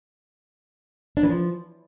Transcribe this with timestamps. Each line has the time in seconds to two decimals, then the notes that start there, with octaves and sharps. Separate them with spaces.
1.17 D4
1.23 E3
1.29 F3